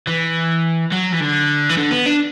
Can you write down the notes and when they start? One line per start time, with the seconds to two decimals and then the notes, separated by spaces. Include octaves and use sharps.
0.07 E3
0.92 F#3
1.12 E3
1.20 D3
1.69 E3
1.77 D3
1.91 B3
2.06 D4